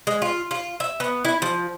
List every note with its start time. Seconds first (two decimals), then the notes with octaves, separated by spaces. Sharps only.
0.07 G#3
0.22 F4
0.51 F4
0.80 E5
1.00 B3
1.25 E4
1.42 F3